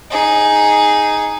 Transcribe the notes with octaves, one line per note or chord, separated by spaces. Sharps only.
D#4 G#4